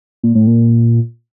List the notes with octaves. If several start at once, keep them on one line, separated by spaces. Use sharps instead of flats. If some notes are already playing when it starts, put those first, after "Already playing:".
A#2
A2
A#2